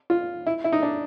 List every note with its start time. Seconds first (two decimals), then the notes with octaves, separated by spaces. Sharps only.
0.10 F4
0.46 E4
0.64 E4
0.72 D#4
0.83 D4